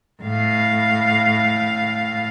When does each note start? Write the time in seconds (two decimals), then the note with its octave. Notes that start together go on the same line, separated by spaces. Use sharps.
0.23 A2 F5